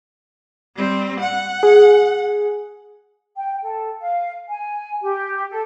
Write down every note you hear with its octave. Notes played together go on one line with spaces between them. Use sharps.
G3 C4
F#5
G#4
G5
A4
F5
G#5
G4
A4